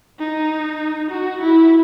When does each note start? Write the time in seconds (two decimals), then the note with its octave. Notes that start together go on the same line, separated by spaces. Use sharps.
0.19 D#4
1.11 F#4
1.41 E4